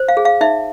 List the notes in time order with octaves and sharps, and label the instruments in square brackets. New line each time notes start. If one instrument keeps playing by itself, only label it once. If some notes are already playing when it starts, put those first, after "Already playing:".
Already playing: [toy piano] C5
F5
G#4
F5
D#4 E5